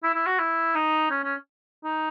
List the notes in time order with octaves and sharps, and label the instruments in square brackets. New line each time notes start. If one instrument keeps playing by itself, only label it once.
[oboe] E4
E4
F#4
E4
D#4
C#4
C#4
D#4